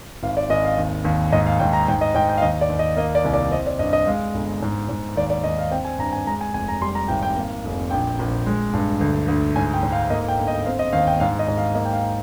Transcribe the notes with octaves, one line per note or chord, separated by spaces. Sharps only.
G#1 F5
D5
G#1 D#5
F5
D#2
D#2
G#2 D#5
F5
G#2 G5
A#5
G#2 G5
D#5
G#2 G5
G5
F5
D#2 D#5
D5
D#2
D#5
A#3 D#5
D5
C2
D5
C4 D#5
D5
G2 D#5
D#5
G#3 F5
G1
G#2
G#2
D#2 D5
D5
D#2 D#5
F5
C4 G5
G#5
G2 A#5
G#5
G#3 A#5
G#5
F1 G#5
A#5
G3 C6
A#5
G#1 G5
G5
A#3
F1
A#1 G5
A#1
G#3
G2
D2
D2
G#2 G#5
G5
G#2
F5
A#3 D#5
G5
G1
D#5
C4 F5
D#5
D#2 F5
G5
G#2 F5
D#5
G#2
F5
A#3 D#5
G5
F5